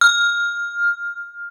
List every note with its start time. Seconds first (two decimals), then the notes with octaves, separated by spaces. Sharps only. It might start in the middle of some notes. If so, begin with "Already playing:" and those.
0.01 F6